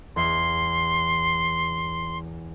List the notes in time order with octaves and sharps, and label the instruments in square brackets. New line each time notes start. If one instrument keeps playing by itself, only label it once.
[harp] E2 E5 [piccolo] C6